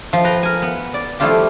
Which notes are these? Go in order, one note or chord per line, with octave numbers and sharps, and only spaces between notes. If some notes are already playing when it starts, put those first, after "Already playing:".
F3
B4 G5 A#5
A#4 G#5
B3
D5
F3 G3 A3 E4 F4 G4